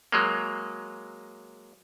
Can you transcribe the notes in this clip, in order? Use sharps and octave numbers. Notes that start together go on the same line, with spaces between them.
F#3 G#3 A#3